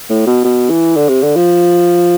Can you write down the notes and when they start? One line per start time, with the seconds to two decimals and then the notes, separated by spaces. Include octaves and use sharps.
0.10 A2
0.27 B2
0.44 B2
0.70 E3
0.96 D3
1.08 C3
1.22 D3
1.35 F3